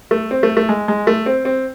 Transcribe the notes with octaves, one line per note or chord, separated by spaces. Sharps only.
A3
C4
A3
A3
G#3
G#3
A3
C4
C4